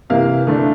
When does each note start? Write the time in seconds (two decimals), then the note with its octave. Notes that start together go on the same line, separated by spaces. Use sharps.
0.10 C3 E3 A#3 F5
0.47 D3 A3 D4